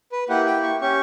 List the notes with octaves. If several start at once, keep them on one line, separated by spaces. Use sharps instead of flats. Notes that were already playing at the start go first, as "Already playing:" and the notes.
B4
A#3 E4 G4 F#5
G5
C#6
C#4 G4 C#6